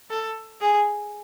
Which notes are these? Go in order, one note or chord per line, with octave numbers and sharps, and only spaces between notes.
A4
G#4